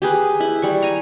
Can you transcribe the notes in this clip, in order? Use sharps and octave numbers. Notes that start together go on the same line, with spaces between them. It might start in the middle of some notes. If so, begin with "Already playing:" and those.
G4 G#4 B4
E4
G3 C#6
G#5 A#5